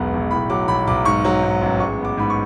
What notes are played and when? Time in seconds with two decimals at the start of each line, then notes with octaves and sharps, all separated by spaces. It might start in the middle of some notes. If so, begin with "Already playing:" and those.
Already playing: E1 B1 G#3 B3
0.13 B1
0.31 A2 B5
0.50 F#3 D6
0.68 B1 B5
0.87 B1 D6
1.05 G#2 C#6
1.25 F#3
1.43 G#2
1.62 A1
1.80 G#3 C#6
1.99 B3
2.05 D6
2.17 G#2 B5
2.30 C#6